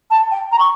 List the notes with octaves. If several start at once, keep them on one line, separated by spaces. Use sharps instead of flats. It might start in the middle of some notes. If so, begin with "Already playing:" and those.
A5
G5
A#5
C#6